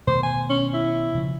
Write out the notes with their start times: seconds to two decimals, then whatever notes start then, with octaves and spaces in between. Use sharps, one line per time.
0.07 B2 D#3 A3 C5
0.23 G#5
0.50 C#4
0.74 E4
1.15 C#3 F3